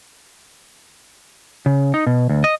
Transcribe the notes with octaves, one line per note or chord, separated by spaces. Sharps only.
C#3
D#4
B2
D2
D#5